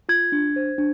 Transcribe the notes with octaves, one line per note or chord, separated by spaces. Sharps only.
F4 G#6
D4
C5
D4